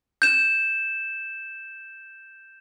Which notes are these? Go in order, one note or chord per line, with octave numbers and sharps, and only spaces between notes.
G6 E7